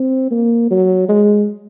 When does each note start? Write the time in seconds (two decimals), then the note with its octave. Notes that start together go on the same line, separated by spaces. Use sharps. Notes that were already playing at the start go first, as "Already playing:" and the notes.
Already playing: C4
0.31 A#3
0.71 F#3
1.09 G#3